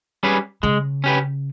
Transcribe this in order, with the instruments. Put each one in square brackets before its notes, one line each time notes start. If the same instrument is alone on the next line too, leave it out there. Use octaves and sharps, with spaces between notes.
[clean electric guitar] G3 C#4 G#4 B4
[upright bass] C#3 [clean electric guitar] G#3
[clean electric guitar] C#4 G4 B4